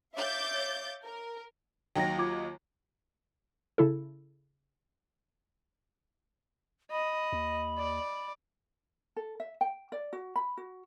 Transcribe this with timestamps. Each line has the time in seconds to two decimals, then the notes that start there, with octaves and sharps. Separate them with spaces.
0.14 C#5 E5 F5 D6 G6 A6
1.03 A#4
1.96 D#2 F#3 D#4 G5 A#6
2.19 F4 D6 G#6
3.78 C#3 E4 A4
6.91 D#5 B5
7.32 D#2
7.78 D5
9.16 A4
9.40 E5
9.61 G5
9.92 D5
10.13 F#4
10.36 B5
10.57 F#4